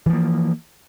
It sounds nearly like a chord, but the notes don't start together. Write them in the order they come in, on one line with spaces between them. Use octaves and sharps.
E3 F3 A#3